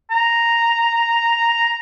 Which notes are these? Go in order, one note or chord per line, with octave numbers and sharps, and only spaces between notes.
A#5